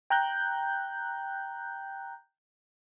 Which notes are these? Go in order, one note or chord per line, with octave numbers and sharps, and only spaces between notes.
G5 A#5 F#6 G6